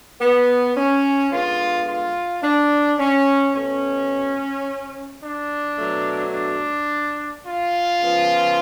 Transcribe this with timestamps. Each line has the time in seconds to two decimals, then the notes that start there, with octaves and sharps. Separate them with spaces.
0.20 B3
0.75 C#4
1.30 D3 G#3 B3 F4
1.86 F4
2.42 D4
2.98 C#4
3.54 B2 A3 C#4
5.21 D4
5.77 B2 F#3 A3
6.33 D4
7.45 F4
8.01 C#3 F3 B3